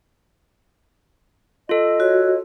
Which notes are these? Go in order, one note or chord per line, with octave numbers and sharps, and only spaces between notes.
F4 A4 D#5
F#4 C#5